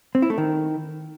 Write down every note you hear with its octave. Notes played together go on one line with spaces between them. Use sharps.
C4
E4
A3
D#3